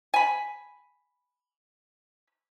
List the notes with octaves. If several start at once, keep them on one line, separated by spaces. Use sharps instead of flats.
G#5 B5